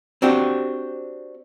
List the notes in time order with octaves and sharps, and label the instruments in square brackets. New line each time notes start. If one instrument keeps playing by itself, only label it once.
[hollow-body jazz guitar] C4 D4 F#4 G4